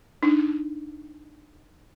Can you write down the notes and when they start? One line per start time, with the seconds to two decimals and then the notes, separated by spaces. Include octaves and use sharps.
0.23 D4 D#4